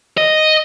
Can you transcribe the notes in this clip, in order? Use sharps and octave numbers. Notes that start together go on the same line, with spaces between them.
D#5